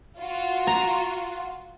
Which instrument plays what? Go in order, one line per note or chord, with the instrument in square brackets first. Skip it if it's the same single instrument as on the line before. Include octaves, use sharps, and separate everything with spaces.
[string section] F4 F#4
[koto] A#5